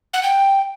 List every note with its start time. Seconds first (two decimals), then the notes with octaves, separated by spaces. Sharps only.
0.14 F#5
0.23 G5